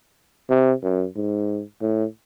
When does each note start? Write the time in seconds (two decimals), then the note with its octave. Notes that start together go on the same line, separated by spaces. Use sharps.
0.50 C3
0.83 F#2
1.16 G#2
1.82 A2